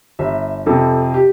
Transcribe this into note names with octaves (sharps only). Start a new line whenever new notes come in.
G1 E5
F2 C3 A4
G4